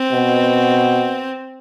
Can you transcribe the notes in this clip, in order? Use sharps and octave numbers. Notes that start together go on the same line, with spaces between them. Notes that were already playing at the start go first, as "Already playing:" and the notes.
Already playing: C4
B2